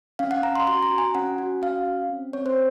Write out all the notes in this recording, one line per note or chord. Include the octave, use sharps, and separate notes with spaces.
C#4 F5
F#5
C#4 A#5
C6
F#4 C6
A#5
F#4
G#5
C#4 F#5
F#4
C#4 F5
C#4
C4
C4 C#5
C5